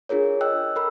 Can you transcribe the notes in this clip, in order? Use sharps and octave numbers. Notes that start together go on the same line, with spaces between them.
D4 F4 G#4 A#4 C#5
D#5 G5 E6 F#6
A4 A#4 B5 E6